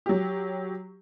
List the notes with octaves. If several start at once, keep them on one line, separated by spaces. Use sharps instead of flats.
F#3 G4